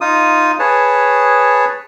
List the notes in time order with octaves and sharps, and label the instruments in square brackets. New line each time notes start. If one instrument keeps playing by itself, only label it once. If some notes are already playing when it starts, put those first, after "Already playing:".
[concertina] D#4 F4 D#6
G#4 B4 C#5 A5